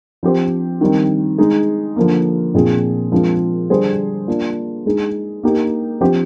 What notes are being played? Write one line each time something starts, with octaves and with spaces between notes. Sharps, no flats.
F3 C4 G4 C5
D#3 G3 C4
G#3 D#4 G#4
D3 F3 A#3
A#2 F3 C4 F4 G#4
F3 G#3 C4 F4 A#4
D3 G3 D4 G#4 C5
A#3 D4 F4
G#3 D#4 G#4
A#3 D#4 G4
F3 C4 G4 C5